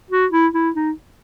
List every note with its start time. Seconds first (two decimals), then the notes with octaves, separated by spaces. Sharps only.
0.11 F#4
0.32 E4
0.54 E4
0.76 D#4